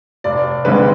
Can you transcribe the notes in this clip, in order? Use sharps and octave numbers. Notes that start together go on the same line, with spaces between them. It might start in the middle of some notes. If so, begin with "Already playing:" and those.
F1 D5
D#2 D3 G#3 C4 B4